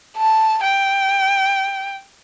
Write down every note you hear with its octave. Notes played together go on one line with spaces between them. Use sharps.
A5
G5